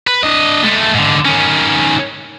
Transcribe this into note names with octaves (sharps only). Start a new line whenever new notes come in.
B4
D4 D#5
G#3 A3
G#2 D3
D#3 C#4